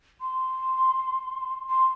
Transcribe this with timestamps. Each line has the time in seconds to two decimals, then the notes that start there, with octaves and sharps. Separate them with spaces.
0.21 C6
1.69 C6